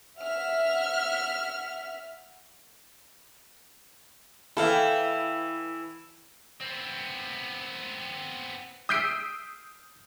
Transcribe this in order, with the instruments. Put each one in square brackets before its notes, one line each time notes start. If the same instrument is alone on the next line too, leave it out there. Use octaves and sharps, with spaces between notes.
[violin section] E5 F#5 F6
[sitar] E3 E4 [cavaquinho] A4 F5 G5
[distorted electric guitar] B3 C4
[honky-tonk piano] D#6 E6 G6 B6 C7 D7